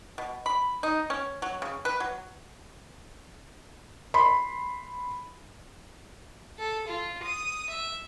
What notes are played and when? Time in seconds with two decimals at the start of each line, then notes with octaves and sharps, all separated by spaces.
0.18 B2
0.46 B5
0.83 D#4
1.10 C#4
1.42 F#3
1.62 C#3
1.85 B4
2.00 F#3
4.14 B5 C6
6.59 A4
6.87 F4
7.23 D#6
7.70 E5